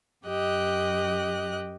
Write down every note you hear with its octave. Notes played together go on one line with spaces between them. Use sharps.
F#2 G4 D#5 F#6